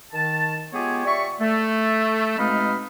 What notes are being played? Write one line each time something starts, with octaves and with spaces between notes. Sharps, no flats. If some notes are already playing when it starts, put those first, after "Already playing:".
D#3 A5
G#3 B3 F4 G4 G#4 C#5
G4 D5 E5 C#6
A3
B2 G#3 C4 D#4 F5 B5